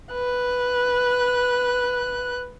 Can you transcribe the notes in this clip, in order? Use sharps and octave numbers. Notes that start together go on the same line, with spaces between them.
B4 F#6